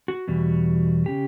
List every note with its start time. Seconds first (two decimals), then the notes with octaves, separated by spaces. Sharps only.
0.08 F#4
0.28 E2 B2 G3
1.06 C#3 G4